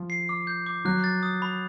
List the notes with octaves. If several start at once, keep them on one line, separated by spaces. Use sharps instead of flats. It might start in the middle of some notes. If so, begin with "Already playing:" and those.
Already playing: F3
C7
D6
G6
D6
F#3 F#6
A6
D#6
B5